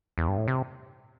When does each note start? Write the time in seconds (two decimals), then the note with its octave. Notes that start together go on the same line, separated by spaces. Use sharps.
0.18 E2
0.28 G2
0.38 A2
0.48 C3